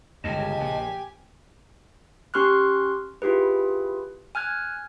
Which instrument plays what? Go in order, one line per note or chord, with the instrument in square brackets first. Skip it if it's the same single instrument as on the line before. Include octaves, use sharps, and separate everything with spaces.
[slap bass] G1 C#2 G2 [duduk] C#3 [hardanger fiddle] G4 G#5 [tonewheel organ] D#5 A5
[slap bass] A#1
[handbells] C#4 G4 C6 C#6 F6 F#6
E4 F4 G4 G#4 B4
G#5 F6 F#6 G#6